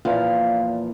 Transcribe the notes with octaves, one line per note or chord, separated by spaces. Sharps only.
E2 A#2 F3 F5